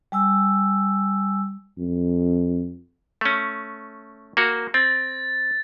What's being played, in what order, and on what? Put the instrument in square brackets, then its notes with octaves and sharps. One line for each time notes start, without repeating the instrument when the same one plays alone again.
[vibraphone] G3 G#5 E6
[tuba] F2
[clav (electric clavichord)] A3 C#4
A#3 F#4
[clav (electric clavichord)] C4 [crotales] A6